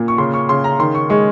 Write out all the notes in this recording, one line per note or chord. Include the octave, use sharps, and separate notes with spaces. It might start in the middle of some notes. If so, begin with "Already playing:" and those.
Already playing: A#2
C#6
C#3 C6
C#6
C#3 C6
A#5
D#3 C6
C#6
G#3 C#6